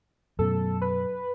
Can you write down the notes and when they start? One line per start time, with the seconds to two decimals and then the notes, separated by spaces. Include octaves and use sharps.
0.39 F#2 B2 A4
0.82 B4